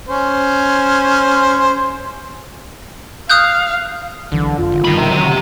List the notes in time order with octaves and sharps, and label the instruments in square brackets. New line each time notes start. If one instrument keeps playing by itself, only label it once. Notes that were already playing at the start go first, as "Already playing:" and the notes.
[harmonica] C#4 C5
[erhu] F5 [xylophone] D#6 F#6 G6
[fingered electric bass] B1 E3 F#3 [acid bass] D3
[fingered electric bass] F#1 F2 [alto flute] F4
[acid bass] G#1 [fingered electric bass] D3
[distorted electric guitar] G2 B5 [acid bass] D#3
[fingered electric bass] D1 B2 G3 [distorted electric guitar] G4 E5 [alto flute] A#5
[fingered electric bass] D3 [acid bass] F#3